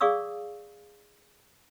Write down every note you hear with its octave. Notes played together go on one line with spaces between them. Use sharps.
G#4 D5 F5 C#6 D#6 E6